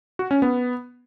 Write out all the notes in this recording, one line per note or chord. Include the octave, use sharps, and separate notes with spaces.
F#4
C#4
B3